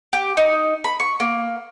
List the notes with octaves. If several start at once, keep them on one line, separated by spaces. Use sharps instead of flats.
G4
D#4
B5
C#6
A#3